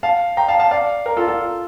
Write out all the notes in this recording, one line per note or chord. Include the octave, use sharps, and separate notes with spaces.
F5 A5
G5 A#5
F5 A5
F5 A5
D5 F5
A#4
F4 A4
F4 A4